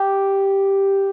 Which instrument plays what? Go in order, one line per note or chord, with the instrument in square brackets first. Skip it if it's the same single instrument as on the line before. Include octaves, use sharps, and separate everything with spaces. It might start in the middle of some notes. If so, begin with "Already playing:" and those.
Already playing: [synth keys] G4